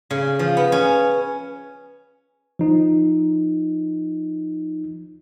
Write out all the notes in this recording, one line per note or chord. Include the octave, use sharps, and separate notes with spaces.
C#3
F3
B3
C#4
F3 D#4